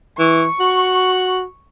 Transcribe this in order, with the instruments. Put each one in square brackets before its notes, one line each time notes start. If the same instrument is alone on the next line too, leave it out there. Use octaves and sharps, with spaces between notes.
[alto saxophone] E3 [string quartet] C#6
[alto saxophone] F#4